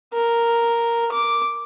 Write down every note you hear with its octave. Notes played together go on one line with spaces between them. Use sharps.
A#4
D6